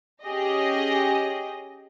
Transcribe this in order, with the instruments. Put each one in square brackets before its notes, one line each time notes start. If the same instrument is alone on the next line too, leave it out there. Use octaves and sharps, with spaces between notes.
[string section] C#4 G4 G#4 D#5